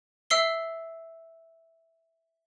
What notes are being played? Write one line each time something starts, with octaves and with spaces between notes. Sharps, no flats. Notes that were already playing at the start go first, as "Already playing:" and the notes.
E5 E6 C7 G7